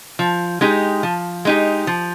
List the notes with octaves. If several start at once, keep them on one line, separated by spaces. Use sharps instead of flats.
F3
G#3 D#4 G4
F3
G#3 D#4 G4
F3